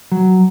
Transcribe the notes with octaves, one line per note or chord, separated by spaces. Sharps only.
F#3